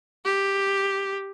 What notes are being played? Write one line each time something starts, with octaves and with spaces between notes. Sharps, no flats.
G4